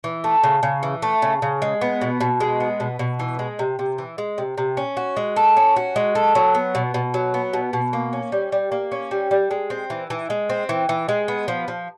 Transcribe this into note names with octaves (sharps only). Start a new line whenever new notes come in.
E3
A3
C#3
C#3
E3
A3
C#3
C#3
G#3
B3
B2
B2
G#3
B3
B2
B2
E3
G#3
C3
C3
E3
G#3
C3
C3
C#4
F#4
G#3
A4
C#4
F#4
G#3
A4
F#3
B3
B2
B2
F#3
B3
B2
B2
A#3
C#4
G3
G3
A#3
C#4
G3
G3
G#3
C4
E3
E3
G#3
C4
E3
E3
G#3
B3
F3
F3